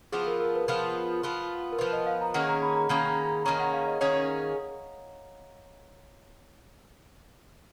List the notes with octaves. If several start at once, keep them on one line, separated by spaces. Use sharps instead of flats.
F3 B3 F4 G#4
A#4
A#4
B4
F3 B3 F4
F3 B3 F4
A#4
F3 B3 F4 B4
D#5
F5
A#5
D#3 A#3 C#4 G#4 F#5
A#5
B5
A#5
D#3 A#3 C#4 G#4 B5
D#3 A#3 C#4 G#4 A#5
F#5
F5
D#5
D#3 A#3 C#4 G#4 C#5